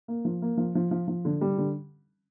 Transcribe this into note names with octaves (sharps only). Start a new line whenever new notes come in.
A#3
F3
A#3
F3
F3
F3
F3
D3
G3
D3